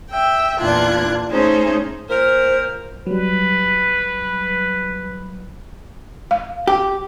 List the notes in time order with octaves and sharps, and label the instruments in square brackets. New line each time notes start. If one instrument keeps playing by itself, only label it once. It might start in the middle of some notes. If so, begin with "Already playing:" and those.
[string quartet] E5 G5
E2 A#2 D4 F4 F#6 G#6
A3 C#4 D#4 G#4 C5
[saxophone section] A#2 A#4 [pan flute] C5
[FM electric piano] F#3 G3 [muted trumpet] B4
[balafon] F5
[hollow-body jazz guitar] G4